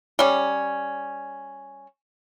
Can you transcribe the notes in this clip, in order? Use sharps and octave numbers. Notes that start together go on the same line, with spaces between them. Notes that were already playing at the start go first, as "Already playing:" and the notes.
G3 C#4